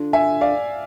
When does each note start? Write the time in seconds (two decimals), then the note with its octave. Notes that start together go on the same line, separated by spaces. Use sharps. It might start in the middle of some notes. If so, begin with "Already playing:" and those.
Already playing: D3 D4 F4
0.13 E5 G#5
0.41 D5 F5